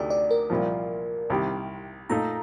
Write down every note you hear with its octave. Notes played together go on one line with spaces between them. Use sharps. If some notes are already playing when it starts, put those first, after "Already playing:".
Already playing: D2 C3 D#3 A3 D5
D5
A#4
C2 A#2 F3
C2 C3 D#3 G3
A#2 A3 D#4 A#5